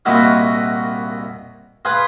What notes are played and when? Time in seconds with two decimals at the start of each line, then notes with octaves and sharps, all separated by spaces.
0.05 C2 A#2 D#4 E4 F#4 F5
1.85 F4 G#4 B4